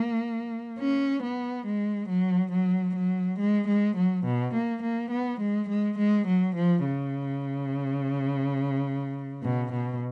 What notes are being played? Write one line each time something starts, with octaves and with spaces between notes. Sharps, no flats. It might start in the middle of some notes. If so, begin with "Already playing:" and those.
Already playing: A#3
C#4
B3
G#3
F#3
F#3
F#3
G#3
G#3
F#3
B2
A#3
A#3
B3
G#3
G#3
G#3
F#3
F3
C#3
B2
B2